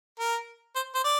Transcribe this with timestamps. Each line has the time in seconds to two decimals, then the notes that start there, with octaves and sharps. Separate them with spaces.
0.19 A#4
0.76 C5
0.95 C5
1.04 D5